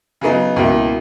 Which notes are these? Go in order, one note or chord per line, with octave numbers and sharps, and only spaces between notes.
C#3 F#3 B3 D#4
C#2 B2 A#3 E4